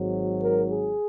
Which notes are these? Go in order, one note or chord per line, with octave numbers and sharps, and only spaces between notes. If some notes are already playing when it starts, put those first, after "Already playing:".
Already playing: G#1 G#2 F#3
A#4
G#4